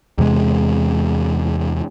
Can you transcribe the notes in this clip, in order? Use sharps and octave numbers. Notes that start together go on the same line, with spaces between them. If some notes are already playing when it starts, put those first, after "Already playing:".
E2 C3 G#3